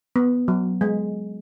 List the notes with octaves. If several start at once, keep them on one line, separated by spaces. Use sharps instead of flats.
B3
F#3
G#3